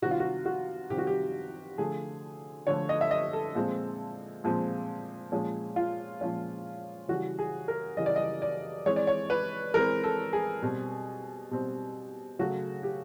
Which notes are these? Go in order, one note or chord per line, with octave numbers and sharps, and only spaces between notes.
C3 D#3 G3 C4 F#4
F4
F#4
F#4
C3 D#3 G3 C4 G4
F#4
G4
D3 F3 A3 G#4
D3 F3 A3 C#5
D#5
E5
D#5
A4
A#2 F3 G#3 C4
A#2 F3 G#3 C4
A#2 F3 G#3 C#4
F4
A#2 F3 G#3 C#4
C#3 E3 G3 F#4
G#4
A#4
C#3 E3 G3 D#5
D5
D#5
D5
E3 G#3 C4 C#5
D5
C#5
B4
E3 G#3 C4 A#4
A4
G#4
B2 G3 C4
B2 G3 C4
C#3 F#3 A3 F#4
G4